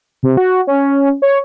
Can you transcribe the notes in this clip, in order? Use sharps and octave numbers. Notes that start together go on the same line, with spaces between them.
C3
F#4
C#4
C#5